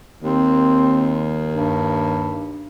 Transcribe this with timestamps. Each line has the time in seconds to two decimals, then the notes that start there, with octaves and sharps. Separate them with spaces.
0.23 D#2 C4
1.53 G2